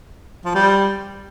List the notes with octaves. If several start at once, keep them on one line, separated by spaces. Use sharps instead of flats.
F3
G3